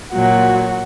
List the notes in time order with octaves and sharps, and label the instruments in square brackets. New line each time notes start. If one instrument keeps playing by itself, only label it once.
[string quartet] A#2 F#3 F#4